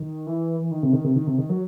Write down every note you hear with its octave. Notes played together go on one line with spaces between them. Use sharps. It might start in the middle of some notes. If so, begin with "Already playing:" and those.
Already playing: D#3
E3
E3
D#3
C3
D#3
C3
D#3
C3
D#3
F#3